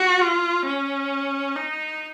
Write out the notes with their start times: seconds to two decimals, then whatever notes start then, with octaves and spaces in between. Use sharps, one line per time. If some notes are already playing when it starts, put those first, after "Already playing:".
Already playing: F#4
0.21 F4
0.66 C#4
1.56 D#4